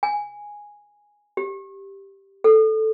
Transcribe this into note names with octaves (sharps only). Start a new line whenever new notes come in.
G#5
G4
A4